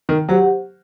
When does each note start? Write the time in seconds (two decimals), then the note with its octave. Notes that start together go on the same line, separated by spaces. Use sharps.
0.09 D#3
0.29 F#3 G4 C5 F#5